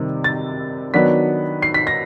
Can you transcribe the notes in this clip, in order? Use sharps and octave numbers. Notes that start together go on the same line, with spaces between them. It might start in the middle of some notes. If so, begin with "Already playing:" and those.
Already playing: C3 D#3 G3 C4
A6
D#3 F#3 B3 D4 B6
C7
B6
A#6